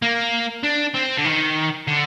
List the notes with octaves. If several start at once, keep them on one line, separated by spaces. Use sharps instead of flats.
A#3
D4
C4
D3
D#3
D3